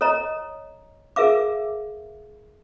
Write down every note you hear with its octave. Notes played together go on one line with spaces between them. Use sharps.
A4 C#5 D#5 A#5
G#4 A#4 E5 F5 D6